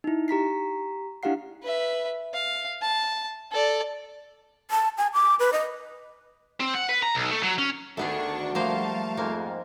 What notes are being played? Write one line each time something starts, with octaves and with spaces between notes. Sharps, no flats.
D#4 E4
G4 A#5 B6 C7
D4 E4 G4 F5 F#5 C7
B4 E5
F5
A5
A4 D5
A5
G#5
D6
B4
D#5
C4
F#5
B4
A#5
B1
A3
F#3
C#4
D2 D#3 A3 B3 D4 F#4 G#4 C#6
F3 G3 A3 A#3 C5 F5 A5
F2 G#2 A#3